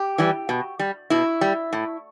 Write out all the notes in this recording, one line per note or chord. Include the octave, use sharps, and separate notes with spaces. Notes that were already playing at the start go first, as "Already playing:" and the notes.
Already playing: G4
E3 G3
B2
G3
B2 E4
G3
A2